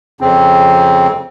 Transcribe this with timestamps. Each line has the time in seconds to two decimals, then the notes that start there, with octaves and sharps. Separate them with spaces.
0.21 F2 C#3 C4